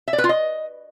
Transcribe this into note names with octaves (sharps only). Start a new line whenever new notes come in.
E5
D5
B4
F4
D#5